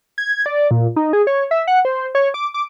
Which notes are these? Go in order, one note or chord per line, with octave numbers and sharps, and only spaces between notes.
G#6
D5
A#2
D#4
G#4
C#5
E5
F#5
C5
C#5
D6
D6